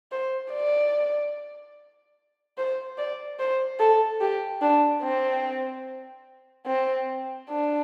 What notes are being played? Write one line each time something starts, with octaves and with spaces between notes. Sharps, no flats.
C5
D5
C5
D5
C5
A4
G4
D4
C4
C4
D4